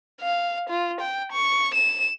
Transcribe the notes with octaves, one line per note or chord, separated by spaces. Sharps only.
F5
F4
G5
C#6
E7